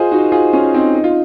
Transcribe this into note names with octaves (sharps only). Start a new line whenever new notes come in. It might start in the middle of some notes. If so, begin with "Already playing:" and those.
Already playing: F4 G#4 C5 D#5
D#4 F#4
F4 G#4
C#4 F4
C4 D#4
D#4
F4